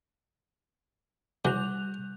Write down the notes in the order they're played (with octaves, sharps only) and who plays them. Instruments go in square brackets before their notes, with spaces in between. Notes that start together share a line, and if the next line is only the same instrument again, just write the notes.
[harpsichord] C#3 E3 F#3 [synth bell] G3 F#6 F7